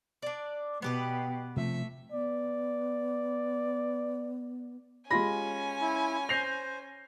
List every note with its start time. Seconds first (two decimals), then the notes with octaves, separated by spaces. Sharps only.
0.22 D4 D5
0.82 B2 B3 G4 B4
1.56 C3 F3 A3 E5
2.12 B3 D5
5.10 G#3 C#4 F4 G4 G#5 B5 A#6
5.81 E4
6.29 C5 G6 A#6 C7 F7